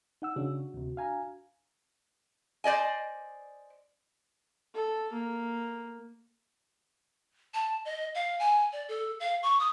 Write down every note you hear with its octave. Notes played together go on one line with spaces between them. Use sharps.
D#4 F#5 E6
C#3 D4 F#4
D2 C3
F5 G#5 A#5
C5 D5 D#5 G#5
A4
A#3
A5
D#5
F5
G#5
D5
A4
F5
C#6
D#6